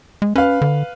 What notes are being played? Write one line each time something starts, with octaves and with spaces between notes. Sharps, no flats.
G#3
C#4 B4 F5
D3